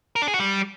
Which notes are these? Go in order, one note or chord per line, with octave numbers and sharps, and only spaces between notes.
A#4
D4
G#4
F#4
G3